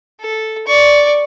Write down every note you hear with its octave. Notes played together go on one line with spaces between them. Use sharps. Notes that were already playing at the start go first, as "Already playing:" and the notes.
A4
D5 C#6